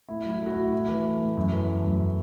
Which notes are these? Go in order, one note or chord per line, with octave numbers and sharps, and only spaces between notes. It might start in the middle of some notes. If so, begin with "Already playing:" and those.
A2 E4
F#3 E4
A3
F#4
A2 E4
A2 E4
E3
A3
A2
F#2
E3
A3
F#2